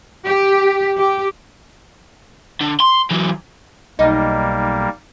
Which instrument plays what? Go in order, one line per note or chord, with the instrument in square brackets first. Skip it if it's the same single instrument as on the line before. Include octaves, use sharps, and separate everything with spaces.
[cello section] G4
G4
[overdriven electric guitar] D3
C6
E3 F#3
[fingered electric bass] B1 [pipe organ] G3 A#3 [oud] D#4